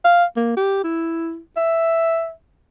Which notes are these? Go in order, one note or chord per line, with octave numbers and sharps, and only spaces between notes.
F5
A#3
G4
E4
E5